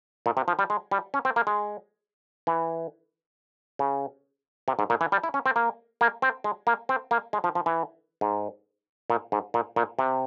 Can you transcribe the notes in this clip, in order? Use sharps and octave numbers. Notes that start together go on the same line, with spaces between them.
A#2
C3
F3
G3
G#3
G3
C#4
C4
A#3
G#3
E3
C#3
C3
G#2
A#2
E3
G3
E4
C#4
C4
A#3
A#3
C4
G#3
A#3
C4
A#3
G#3
F3
F3
E3
G#2
A#2
G#2
A#2
A#2
C3